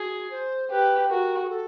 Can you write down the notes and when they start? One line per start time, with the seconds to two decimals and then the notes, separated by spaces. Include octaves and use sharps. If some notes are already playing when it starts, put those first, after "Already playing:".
Already playing: F#4 G#4
0.30 C5
0.70 G4 B4
1.10 F#4 A#4
1.44 G#4
1.50 A4